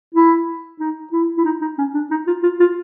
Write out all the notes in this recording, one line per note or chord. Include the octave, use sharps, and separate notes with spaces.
E4
D#4
E4
E4
D#4
D#4
C#4
D4
D#4
F4
F4
F4